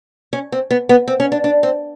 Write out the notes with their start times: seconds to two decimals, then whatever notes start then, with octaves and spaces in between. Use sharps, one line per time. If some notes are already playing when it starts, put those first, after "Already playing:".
0.33 C#4
0.52 C4
0.71 B3
0.89 B3
1.08 C4
1.20 C#4
1.32 D4
1.44 D4
1.63 C4